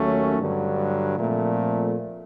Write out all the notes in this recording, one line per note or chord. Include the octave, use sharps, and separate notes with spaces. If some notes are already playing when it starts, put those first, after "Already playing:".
Already playing: D#2 D#3 F#3 A3 C#4
G2 D3 F#3
A#2 F3 A3 C4